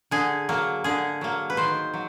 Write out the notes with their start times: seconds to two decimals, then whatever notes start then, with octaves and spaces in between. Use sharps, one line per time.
0.11 D3 G#4
0.49 F#3 A#3
0.84 D3 G#4
1.21 F#3 A#3
1.50 B4
1.57 D#3 C5
1.94 F#3